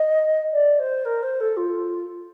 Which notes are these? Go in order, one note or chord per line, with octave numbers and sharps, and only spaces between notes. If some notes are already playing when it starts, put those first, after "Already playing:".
Already playing: D#5
D5
C5
A#4
C5
A4
F4